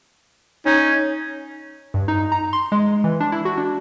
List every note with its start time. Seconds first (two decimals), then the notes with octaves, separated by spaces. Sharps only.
0.66 C#4 D#4
1.94 G2
2.08 D#4
2.32 A#5
2.53 C6
2.72 G#3
3.04 E3
3.20 D4
3.32 E4
3.45 F#4
3.57 D4